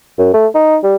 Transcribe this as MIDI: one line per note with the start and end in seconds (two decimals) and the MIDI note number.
0.18 0.29 42
0.34 0.47 57
0.55 0.77 63
0.83 0.96 55